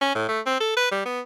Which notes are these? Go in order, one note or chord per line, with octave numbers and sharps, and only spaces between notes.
C#4
A2
A3
C4
A4
B4
G3
B3